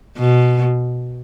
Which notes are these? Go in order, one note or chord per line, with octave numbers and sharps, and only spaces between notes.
B2